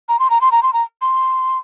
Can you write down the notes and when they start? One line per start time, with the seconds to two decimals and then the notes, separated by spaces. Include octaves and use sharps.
0.09 A#5
0.19 C6
0.30 A#5
0.41 C6
0.52 A#5
0.63 C6
0.73 A#5
1.02 C6